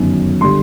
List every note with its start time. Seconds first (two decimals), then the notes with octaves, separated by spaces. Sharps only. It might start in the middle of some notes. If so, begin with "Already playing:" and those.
Already playing: G1 F#2 D#3 F#3
0.41 D3 G3 C6